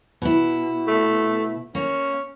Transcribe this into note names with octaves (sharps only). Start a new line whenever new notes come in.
B2 E4
A3
A#3 C#4